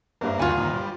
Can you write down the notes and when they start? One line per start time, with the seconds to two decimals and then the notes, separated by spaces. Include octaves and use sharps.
0.21 F#1 G2 A#3 E5
0.39 D2 F4 F#4 G#5
0.57 A#2 D#3
0.73 G3